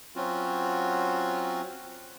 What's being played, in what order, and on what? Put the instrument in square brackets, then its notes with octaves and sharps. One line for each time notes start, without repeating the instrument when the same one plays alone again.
[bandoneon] F#3 C4 C#4 F4 F#4